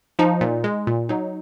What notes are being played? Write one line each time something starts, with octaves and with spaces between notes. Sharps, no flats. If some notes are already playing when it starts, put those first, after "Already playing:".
F3 D#4
A#2
G#3
A#2
F#3 D#4